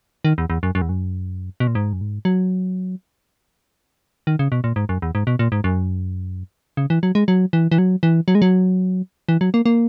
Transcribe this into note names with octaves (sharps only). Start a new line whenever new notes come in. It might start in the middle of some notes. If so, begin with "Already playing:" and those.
D#3
E2
E2
F#2
F#2
E2
F#2
B2
A#2
G#2
F#2
G#2
F#3
D#3
C#3
B2
A#2
G#2
F#2
E2
G#2
B2
A#2
G#2
F#2
C#3
E3
F#3
G#3
F#3
E3
E3
F#3
E3
F#3
G#3
F#3
E3
F#3
A#3
A#3